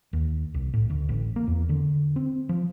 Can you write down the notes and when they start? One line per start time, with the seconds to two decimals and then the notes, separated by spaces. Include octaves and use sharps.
0.13 D#2
0.54 C2
0.74 A2
0.90 D2
1.09 A1
1.36 A#3
1.47 E2
1.69 D3
2.16 C4
2.49 F3